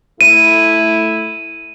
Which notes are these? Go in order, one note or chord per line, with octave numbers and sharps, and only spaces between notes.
A3 E4 D#7